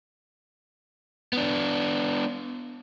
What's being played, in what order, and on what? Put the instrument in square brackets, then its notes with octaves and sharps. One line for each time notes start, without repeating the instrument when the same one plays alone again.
[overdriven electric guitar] B3 D4